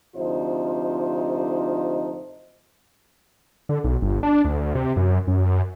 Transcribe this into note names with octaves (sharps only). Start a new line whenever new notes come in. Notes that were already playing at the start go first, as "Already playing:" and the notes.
D2 C3 F3 D#4 F4 C5
D3
B1
G1
D4
D2
C3
F#2
F#2